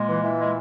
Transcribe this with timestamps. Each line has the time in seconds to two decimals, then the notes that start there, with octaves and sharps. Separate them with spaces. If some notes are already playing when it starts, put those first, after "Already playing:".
Already playing: A#2 G#3
0.08 E3
0.23 E3
0.38 G#3